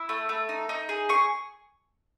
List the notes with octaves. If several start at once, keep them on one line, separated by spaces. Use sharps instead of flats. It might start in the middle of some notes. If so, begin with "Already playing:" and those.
Already playing: E4
A3
A3
D#4
D#4
G#4
G#4 C#6